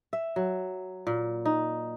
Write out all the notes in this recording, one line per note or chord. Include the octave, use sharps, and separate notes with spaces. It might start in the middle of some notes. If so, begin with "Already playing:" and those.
E5
F#3
A#2
D#4